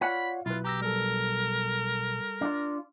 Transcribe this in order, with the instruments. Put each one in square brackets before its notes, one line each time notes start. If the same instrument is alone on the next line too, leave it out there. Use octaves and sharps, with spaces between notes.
[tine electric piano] F4 C#5 D5 [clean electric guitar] F5 F#5 [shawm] B5
[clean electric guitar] B1 B4 [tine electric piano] E4 [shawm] F4
[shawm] G4 [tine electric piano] A#5 E6 A#6
[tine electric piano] G3 A4 [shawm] A#4
[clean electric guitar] D4 F4